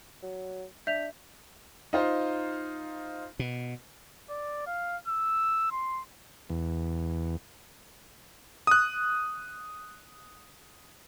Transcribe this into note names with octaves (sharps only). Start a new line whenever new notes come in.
F#3
D4 E5 G6 B6 F7
D#4 F4 C5
B2
D5
F5
E6
C6
E2
D#6 F#6